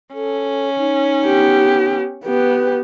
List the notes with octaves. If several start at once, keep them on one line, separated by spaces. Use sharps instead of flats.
C#4 A4
D#4
B3 G4
B3 G4 B4